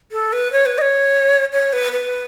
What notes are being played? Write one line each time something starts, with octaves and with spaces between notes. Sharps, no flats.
A4
B4
C#5
B4
D#5
C#5
C#5
B4
B4